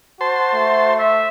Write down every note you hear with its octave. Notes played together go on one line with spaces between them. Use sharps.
F#4 C5 A5 C6
A3
E5